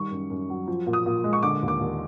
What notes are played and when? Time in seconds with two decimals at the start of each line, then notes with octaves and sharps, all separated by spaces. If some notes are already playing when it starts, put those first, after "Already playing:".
Already playing: D#3 G3 C#6
0.11 F#2
0.30 F#2
0.50 F#3
0.67 F3
0.87 A#2
0.93 D#6
1.06 A#2
1.24 G#3
1.33 C#6
1.43 D3 D6
1.63 D#2
1.68 D6
1.80 D#2